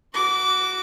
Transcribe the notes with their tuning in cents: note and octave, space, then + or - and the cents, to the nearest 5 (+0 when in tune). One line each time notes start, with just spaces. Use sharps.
F#4 +0 D6 -25